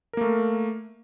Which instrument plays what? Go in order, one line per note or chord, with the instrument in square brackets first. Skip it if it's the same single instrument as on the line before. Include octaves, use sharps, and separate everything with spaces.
[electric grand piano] A#4
A#3
A3